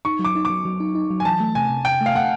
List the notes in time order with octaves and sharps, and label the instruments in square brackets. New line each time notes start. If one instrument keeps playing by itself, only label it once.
[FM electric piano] D#4 [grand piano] C#6
[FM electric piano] F#3
[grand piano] D6
[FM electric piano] D#4
[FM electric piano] F#3 [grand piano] D6
[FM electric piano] F#3
D#4
D#4
F#3
[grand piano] G#5
[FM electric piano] E3 [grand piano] A5
[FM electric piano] A3
[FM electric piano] C3 [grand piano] G#5
[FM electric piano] C3
[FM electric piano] C3 [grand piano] G5
[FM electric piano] A3
[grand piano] F5
[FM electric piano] A3 [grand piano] F#5